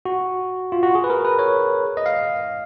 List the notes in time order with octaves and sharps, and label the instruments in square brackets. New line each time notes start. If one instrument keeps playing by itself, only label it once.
[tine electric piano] F#4
F4
F#4
G#4
B4
A#4
B4
C#5
D#5
F5